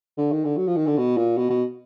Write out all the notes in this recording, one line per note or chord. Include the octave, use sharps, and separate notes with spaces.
D3
D#3
D3
F#3
F3
D#3
D3
B2
A#2
B2
B2